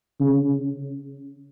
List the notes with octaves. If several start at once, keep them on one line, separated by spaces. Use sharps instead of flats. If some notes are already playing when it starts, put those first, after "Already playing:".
C#3